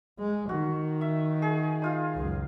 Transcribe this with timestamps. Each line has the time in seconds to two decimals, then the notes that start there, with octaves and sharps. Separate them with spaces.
0.19 G#3
0.49 D#3 F#4
1.01 E5
1.42 G#4
1.82 D#4 F4 F5
2.15 C#2 F#2